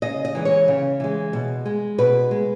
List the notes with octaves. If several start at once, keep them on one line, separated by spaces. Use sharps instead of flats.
C#3 D#5
D#5
E3 G#3
C#5
C#3
E3 G#3
B2
G#3
B2 B4
G#3